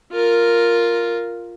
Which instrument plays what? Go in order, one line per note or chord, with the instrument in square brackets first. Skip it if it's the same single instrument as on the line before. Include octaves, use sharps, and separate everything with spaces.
[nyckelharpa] F4 A#4